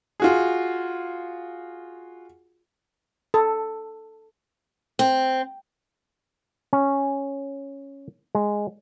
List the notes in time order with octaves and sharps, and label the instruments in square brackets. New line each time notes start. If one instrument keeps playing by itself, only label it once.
[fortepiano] F4 F#4 G#4
[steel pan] A4
[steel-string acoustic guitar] C4
[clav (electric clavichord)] C#4
G#3